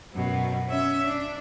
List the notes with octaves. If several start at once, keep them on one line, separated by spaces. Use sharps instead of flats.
F#2 B2
C#4 E5
D4